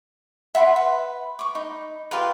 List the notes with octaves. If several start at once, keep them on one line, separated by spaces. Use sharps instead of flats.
E5 F#5 B5 C6
B4
C#6 D6
D#4 B5
F4 G4 A#4 B4